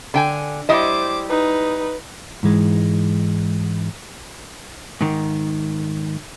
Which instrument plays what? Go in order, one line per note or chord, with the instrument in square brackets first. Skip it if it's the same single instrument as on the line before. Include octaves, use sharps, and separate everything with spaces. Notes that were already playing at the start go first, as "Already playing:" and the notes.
[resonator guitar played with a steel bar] D3 G5 G#5
[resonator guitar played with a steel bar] G3 E4 D#5 [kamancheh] C5 D6
[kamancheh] D#4 B4
[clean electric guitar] G#2 E3 G#3
[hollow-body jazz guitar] G#2 D#3